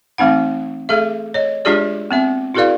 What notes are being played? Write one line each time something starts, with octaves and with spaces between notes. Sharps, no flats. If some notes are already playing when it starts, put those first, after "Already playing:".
E3 A3 C4 D#4 F#5
A3 G#4 A4 E5
C#5 D#5
G#3 D4 F4 G4 G#4 D5
B3 C4 E5
E4 F#4 G#4 A#4 D5 F5